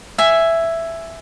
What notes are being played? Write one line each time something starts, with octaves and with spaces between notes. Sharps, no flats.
E5 G#5